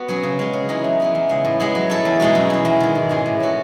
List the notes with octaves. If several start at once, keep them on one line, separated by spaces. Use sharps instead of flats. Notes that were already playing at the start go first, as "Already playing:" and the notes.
Already playing: B3 F#4
F#3 C#4 G#4
C#3
G#3 C#4
C#3
E3 G#3 B3 D#4
F#2
E3 B3 D#4
E2
C#3 G#3
A2
G#3 B3 E4 G#4
F#3
A3 E4 A4
E2
B2 G#3 D#4 F#4
F#2
E3 G#3
E2
D#3 G#3
G#2
E3 G#3 C#4 G#4
A2
G#3 C#4 F#4 A4